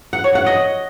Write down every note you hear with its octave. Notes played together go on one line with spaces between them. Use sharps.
F#5
C#5
F#5
D#5